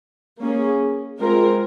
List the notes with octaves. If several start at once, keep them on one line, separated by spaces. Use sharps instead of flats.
A#3 C#4 G#4
G#3 C4 F4 A#4